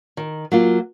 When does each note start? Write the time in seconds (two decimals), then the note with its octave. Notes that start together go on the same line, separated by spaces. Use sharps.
0.17 D#3
0.52 F#3 A#3 F4